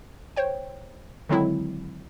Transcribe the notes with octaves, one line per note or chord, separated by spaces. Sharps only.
C5 C#5 G5
D3 D#3 F#3 G#3 C4 E4